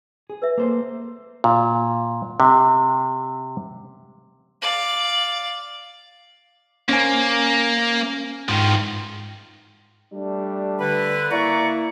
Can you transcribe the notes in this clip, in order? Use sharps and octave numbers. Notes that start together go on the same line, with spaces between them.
G#4
B4 C#5 E5
A#3 A4 C5
A#2
C3
D5 F5
A#3 C#4 C5 G#5
G#2 D#3 F3
G3 A3 D4
D3 B4
A#3 E4 D5 A#5 C#6